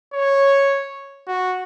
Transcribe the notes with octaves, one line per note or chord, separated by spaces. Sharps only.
C#5
F#4